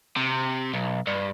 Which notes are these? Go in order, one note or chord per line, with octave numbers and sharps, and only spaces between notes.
C3
B1
G2